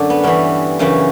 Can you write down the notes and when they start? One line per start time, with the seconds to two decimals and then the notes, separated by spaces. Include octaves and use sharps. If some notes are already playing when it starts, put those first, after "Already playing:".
Already playing: F#2 D3 D4
0.10 B3
0.24 G2 E3 C#4
0.79 F#2 C#3 E3 C#4